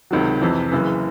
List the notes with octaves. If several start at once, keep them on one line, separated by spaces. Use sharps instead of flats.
C#2 C3 D#3 F#3
F2 C3 E3
F#1 F#2 C#3 E3